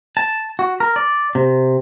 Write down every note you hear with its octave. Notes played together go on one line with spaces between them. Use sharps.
A5
F#4
A#4
D5
C3